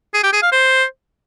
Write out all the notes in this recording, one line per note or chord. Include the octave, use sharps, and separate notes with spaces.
G#4
G4
G#4
F5
C5